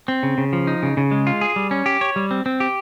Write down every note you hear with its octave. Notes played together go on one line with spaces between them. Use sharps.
C4
C#3
C#3
F3
D#4
C#3
C#3
G#3
F4
G#4
G3
C#4
G4
C#5
G3
C4
C4
G4